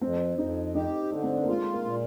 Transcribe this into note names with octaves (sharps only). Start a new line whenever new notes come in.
F2 C4
F2 D#4
D#4 G4
D3 D4
C4
D4
A#3
G#3 F4
A#3
A#2